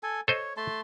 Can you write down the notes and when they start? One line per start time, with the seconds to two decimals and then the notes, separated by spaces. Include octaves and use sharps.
0.03 A4 G#5
0.28 A4 C5 C#5 D#5
0.57 A3 A5 C6